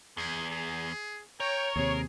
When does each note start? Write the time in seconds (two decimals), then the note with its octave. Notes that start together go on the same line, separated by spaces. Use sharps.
0.17 E2 G#4
0.51 G#4
1.40 A#4 C#5 G5
1.76 D#2 C3 G#4